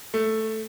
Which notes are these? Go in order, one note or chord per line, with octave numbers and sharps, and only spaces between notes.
A3